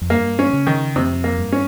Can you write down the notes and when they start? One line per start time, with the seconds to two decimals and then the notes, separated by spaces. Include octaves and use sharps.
0.01 F2
0.10 G2 A#3
0.39 C#4
0.53 C#3
0.67 D#3
0.95 F2 C3
1.24 A#3
1.38 G2
1.52 C#4